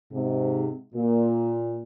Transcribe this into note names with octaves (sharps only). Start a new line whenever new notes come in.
G#2 C3
A#2